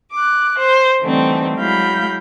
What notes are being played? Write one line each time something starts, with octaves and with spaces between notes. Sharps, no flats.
D6 F#6
C5
D3 E3 G3 A3 C4 D#4
F#3 G#3 E4 F5 B5 G6